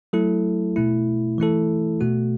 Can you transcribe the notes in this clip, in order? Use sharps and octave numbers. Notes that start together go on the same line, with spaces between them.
F#3 A3 E4 A4
B2 A3 E4
E3 A3 E4 A4
B2 A3 F#4